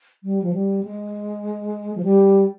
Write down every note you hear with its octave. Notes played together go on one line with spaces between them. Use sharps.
G3
F3
G3
G#3
F3
G3